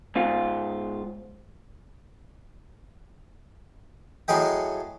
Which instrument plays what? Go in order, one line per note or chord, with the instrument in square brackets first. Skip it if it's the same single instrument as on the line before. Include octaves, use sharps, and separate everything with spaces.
[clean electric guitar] G#2 F4
[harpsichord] A2 F#3 G#4 D#5 G5